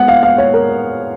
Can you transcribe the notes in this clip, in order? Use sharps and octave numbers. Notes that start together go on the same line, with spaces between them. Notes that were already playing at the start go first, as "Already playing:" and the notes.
Already playing: G#3 B3 F#5
F5
F5
C#5
A#4